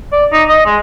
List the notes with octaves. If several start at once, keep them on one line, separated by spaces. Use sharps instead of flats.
D5
D#4
D#5
G#3